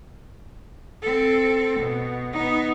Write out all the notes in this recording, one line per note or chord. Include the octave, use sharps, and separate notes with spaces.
C4 A4
B2
B3 D#4